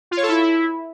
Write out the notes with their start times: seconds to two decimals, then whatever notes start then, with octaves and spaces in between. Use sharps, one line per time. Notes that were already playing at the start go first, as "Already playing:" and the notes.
0.11 F4
0.17 C#5
0.23 A4
0.29 E4